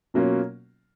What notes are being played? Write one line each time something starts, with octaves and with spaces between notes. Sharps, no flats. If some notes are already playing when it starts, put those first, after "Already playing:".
B2 F#3 A#3 C#4 F4